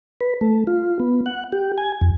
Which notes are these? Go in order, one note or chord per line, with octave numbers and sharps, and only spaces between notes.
B4
A3
F4
B3
F#5
G4
G#5
F2